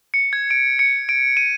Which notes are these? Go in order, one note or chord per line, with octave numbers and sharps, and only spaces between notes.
C#7
G#6
D7
C#7
D7
D#7